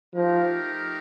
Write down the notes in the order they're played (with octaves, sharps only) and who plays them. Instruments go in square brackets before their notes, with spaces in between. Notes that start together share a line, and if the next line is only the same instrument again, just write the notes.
[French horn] F3 [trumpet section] A3 D#4 G4 A#4 F5